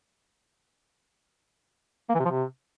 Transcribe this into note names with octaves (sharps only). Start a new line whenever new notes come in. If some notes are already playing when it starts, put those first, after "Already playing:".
A#3
E3
C3
F3
C3